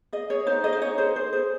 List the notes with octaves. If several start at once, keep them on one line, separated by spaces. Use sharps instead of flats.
G#4 D#5
G#4 C#5
D#4 C5
G#4 D#5
C5
D#4 C#5
G#4 C5
G#4 C5
G#4 C5